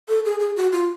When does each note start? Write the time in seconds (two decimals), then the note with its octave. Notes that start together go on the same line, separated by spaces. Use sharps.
0.09 A4
0.25 G#4
0.40 G#4
0.56 F#4
0.72 F4